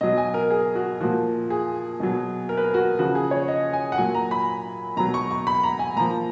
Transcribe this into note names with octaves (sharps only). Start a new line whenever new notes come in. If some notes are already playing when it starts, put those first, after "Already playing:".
B2 F#3 D#5
G#5
A#4
G#4
F#4
A#2 F3 F#4
G#4
B2 F#3
A#4
B4
A#4
F#4
C#3 F3 F#4
G#4
C#5
D#5
G#5
F#5
A#2 F#3 G#5
A#5
B5
B2 F#3 A#5
C#6
C#6
B5
A#5
G#5
A#2 F3 A#5